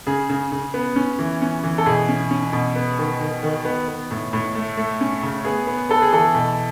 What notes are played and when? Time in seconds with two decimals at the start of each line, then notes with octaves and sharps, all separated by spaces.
0.07 C#3 G#4
0.29 C#3
0.52 C#3
0.74 B3
0.96 C#4
1.19 E3
1.42 C#4
1.64 E3
1.78 A4
1.86 B2 G#4
2.09 C#4
2.31 C#4
2.53 B2
2.76 B3
2.99 D#3
3.21 D#3
3.43 D#3
3.65 B3
3.88 B3
4.11 A2
4.33 A2
4.55 A3
4.77 A3
5.01 C#4
5.23 C#3
5.45 B3 G#4
5.67 B3
5.89 B3 A4
6.02 G#4
6.12 E3 A4
6.35 B2